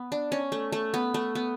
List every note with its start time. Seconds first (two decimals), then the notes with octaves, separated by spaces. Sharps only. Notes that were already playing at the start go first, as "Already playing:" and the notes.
Already playing: B3
0.12 D4
0.32 C#4
0.52 A3
0.72 A3
0.94 B3
1.14 A3
1.35 B3